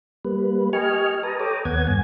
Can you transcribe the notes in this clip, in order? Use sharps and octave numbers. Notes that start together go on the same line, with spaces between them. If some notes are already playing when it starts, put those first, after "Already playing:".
G3 A#3 B4
G4 D#5 G#5 C#6 F6
B4 A5 A#5 D#6
A4 C#5 G5 A#5 D6 D#6
D#2 B3 F#5 G#6
G2 G#5